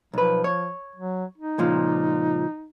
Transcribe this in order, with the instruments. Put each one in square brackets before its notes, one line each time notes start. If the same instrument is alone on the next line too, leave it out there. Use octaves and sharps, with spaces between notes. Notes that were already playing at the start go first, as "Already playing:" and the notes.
[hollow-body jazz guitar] B1 B4 [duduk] F3
[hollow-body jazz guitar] C#5
[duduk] F#3
D#4
[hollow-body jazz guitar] C#2 A#2 F3